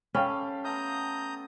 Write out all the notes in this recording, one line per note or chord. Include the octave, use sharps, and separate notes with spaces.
C#4 G4 A4 F5 G5 B5
A3 B3 E5 A#5 D#6 G6